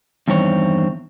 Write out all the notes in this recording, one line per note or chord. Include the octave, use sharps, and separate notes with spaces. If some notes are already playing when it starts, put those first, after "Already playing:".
E2 G2 D#3 C4 C#5